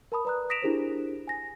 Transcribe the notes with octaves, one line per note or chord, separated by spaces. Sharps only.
A#4 A5 B5 D#6
B4 D5 A#5 D#6 F#6
D#6 A#6 B6 D7 E7 F7
D4 E4 G4 G#4 A#4 C5
G#5 A#6